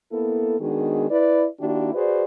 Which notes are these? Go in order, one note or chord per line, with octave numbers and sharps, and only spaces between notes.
A#3 B3 E4 A4
D#3 G#3 B3 D4 F#4 G#4
E4 B4 D5
D#3 A#3 D4 E4 F#4 G4
F#4 G#4 B4 C5 D5